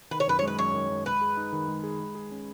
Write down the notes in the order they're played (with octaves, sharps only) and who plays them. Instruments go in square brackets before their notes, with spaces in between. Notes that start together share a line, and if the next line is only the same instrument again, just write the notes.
[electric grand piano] D#3 [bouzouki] B4
[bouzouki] C#5
[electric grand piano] F#2 [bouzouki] B4
[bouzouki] C#5
[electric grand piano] G#3
[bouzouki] B4
[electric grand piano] F#2 [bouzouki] C#5
[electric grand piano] D#3
F#2
[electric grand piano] G#3 [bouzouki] B4
[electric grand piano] G#4
D#4
D#3
G#3
G#4
G#3
G#4
C#4